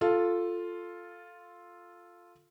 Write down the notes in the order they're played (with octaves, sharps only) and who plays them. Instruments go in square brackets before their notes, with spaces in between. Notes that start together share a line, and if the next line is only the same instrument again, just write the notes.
[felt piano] F4 A4